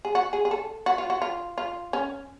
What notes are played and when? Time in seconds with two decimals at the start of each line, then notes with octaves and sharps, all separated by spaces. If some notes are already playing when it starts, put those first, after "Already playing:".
0.05 G#4
0.15 F#4
0.33 G#4
0.45 G#4
0.51 A4
0.86 F#4
0.98 F4
1.10 F#4
1.22 F4
1.58 F4
1.93 C#4